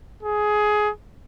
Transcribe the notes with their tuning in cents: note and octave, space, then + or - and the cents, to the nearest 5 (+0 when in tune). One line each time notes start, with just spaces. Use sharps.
G#4 +15